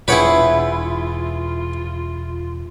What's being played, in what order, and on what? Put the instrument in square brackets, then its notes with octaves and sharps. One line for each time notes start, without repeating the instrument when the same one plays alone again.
[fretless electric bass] E1 [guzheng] E4 G#4 G5 [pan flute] F4 [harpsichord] B4 C#5 F#5